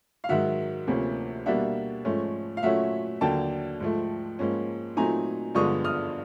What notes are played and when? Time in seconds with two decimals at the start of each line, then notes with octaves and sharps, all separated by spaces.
0.24 F5
0.29 G#2 D#3 F#3 E5 F#5
0.87 D2 C3 F3 A#3 C#4
1.46 B2 G3 A#3 D4 E5 F#5
2.05 G#2 F3 A3 C#4
2.57 F5
2.63 A#2 F#3 A3 C#4 E5 F#5
3.21 D#2 D3 F#3 G5 A5
3.80 G#2 F3 A3
4.39 G#2 F3 A#3 C#4
4.97 A#2 F#3 A3 C4 D#4 G#5 A#5
5.55 G2 D3 F3 G#3 B3 C#6 D#6
5.84 D#6 F6